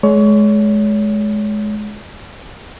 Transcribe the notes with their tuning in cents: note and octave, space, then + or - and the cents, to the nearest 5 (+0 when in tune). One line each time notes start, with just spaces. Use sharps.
G#3 +25 C#5 +30